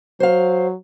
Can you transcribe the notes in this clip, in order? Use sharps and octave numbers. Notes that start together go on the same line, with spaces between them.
F#3 C5 F5